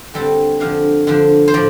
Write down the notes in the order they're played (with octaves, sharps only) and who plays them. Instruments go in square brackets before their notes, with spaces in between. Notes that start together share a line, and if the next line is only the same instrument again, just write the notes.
[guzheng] D3 G3 C4 A4
D3 F3 D4 F5
D3 F3 D4
C5
A2 F3 D5